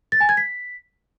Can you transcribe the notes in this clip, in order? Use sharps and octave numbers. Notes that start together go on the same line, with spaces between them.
A6
G#5
G#6
B6